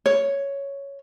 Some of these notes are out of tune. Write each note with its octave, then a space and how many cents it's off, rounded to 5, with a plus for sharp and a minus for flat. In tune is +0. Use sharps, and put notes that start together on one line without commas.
C#5 +5